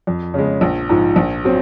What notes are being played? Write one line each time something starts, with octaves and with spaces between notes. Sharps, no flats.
F2
C#3 G#3
A#1
G#2 F3
A#1
F#3 C4